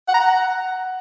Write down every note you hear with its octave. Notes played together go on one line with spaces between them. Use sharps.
F#5
A#5
F#5